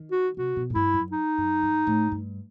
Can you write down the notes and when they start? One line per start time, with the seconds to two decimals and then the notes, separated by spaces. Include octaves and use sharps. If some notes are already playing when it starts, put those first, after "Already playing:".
Already playing: D#3
0.11 F#4
0.37 C3 F#4
0.56 B2
0.70 A2
0.75 G2 E4
0.94 F#2
1.12 D#4
1.38 F#2
1.63 G2
1.87 A2
2.12 G2